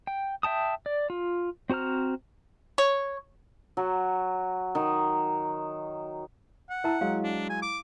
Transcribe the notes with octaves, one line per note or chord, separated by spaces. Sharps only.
G5
E5 G5 A5 D#6
D5
F4
C4 F#4 C5 A#5 F6
C#5
F#3
D#3
F#5
E4 A#4 E5 A5 A#5
F#3 G#3 F5
D4
G#5
D6